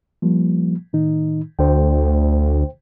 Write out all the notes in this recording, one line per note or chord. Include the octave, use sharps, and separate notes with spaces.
F3 G3 A#3
A2 D#3 D#4
D2 C5 G5